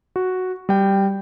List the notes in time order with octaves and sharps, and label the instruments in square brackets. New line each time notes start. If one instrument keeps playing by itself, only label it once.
[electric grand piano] F#4
G3 G5